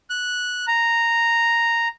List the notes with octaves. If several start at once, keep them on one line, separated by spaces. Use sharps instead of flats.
F#6
A#5